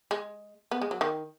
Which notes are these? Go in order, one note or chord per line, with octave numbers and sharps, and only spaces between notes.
G#3
B3
G#3
F#3
D#3